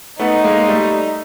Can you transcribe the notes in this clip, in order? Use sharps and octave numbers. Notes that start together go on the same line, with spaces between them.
A3 B3 D#4
G#3 A#3
G3 A3